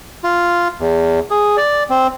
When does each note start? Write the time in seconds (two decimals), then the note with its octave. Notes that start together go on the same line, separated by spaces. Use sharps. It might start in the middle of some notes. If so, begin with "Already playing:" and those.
0.24 F4
0.79 E2
1.31 G#4
1.57 D5
1.90 C4